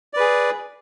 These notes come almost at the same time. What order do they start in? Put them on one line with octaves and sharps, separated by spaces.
D5 B4 G#4